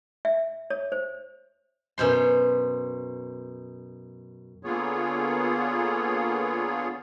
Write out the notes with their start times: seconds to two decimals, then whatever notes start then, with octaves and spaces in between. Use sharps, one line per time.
0.25 E5
0.70 C#5
0.92 C5
1.98 F#2 B2 C5 C6
4.63 D3 A#3 B3 F4 G#4 C#5